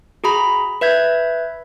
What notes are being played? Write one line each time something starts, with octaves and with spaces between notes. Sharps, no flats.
F#4 G#4 A#5 B5
B4 E5 G6 G#6